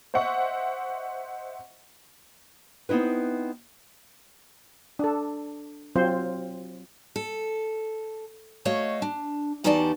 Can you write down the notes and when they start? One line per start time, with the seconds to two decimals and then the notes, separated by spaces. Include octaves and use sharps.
0.14 C5 D#5 E5 F#5 C#6
2.89 B3 C4 D#4 E4 B4
4.99 D4 A4
5.96 F#3 C4 F4 C5
7.16 A4
8.65 A3 F#4 C#5 D#5 F5
9.02 D4
9.64 E2 D#4 F#4 G4 D5 A5